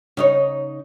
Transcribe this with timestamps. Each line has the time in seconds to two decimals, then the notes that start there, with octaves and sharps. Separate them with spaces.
0.17 C#3 D#4 C#5